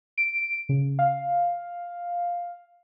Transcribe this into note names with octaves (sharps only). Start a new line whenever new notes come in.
D7
C#3
F5